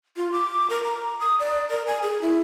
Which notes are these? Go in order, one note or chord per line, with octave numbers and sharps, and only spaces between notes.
F4
D6
A#4
A#5
D#6
D5
A#4
G#5
G#4
E4